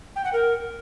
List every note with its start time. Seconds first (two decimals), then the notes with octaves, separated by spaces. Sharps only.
0.16 G5
0.24 F#5
0.33 A#4